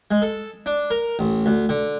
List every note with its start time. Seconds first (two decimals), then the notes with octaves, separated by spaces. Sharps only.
0.11 G#3
0.22 A4
0.66 D4
0.90 A#4
1.19 A1
1.46 D2
1.69 D3